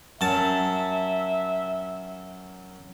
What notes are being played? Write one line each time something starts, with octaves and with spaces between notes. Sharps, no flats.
F#2 E5 A5